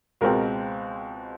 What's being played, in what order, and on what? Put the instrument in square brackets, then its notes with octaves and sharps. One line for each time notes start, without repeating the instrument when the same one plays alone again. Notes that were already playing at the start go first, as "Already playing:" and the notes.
[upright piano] C#2 B2 G#3 C4 A#4